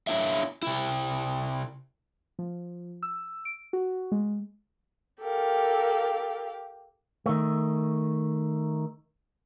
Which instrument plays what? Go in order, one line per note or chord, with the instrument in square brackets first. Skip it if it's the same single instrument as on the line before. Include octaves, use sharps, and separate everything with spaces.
[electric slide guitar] D4 E4 C#5 E5
C3 E4
[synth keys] F3
E6
D7
F#4
G#3
[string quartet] G4 F5 [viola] A4 A#4
[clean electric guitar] D#3 A3